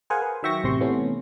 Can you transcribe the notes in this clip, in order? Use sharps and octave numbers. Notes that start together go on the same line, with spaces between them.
G#4 A#4 C5 F5 F#5 G#5
B4
D#3 F#3 E5 G5 C#6 A#6
A1 C3 C6 C#6
C3 E3 A3 B3 C#4